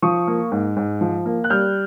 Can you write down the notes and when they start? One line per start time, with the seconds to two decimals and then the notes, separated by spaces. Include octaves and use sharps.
0.02 F3 C#6 D#6
0.27 A#3
0.52 G#2
0.77 G#2
1.01 F3
1.26 A#3
1.44 F#6
1.50 G3 F6 G6